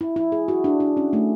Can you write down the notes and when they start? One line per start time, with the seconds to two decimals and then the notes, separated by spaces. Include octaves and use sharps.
0.01 E4
0.16 E4
0.32 G#4
0.48 F#4
0.64 D4
0.80 D4
0.97 C#4
1.13 A3